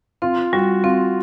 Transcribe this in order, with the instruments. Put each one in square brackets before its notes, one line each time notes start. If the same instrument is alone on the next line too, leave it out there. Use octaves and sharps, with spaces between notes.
[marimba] C4 [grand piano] F4
[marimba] G3 [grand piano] F#4
[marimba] C4 [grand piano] F4